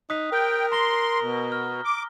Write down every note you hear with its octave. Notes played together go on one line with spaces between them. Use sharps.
D#4 D#6 F#6 B6
A#4 G5
A#5 C6 A#6 G7
B2
F6
D6